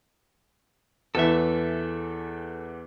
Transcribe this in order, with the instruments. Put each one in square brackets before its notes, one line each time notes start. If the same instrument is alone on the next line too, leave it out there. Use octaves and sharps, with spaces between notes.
[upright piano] E2 E3 [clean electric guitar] A4 E5